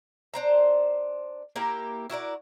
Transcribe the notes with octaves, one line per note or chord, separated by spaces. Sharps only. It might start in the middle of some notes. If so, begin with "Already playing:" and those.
D4 C5 A#5
A#3 E4 G4 A#4
E4 F#4 A#4 D5